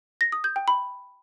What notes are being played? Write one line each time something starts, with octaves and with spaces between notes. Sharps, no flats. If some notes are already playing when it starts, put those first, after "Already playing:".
A#6
D#6
G6
G5
B5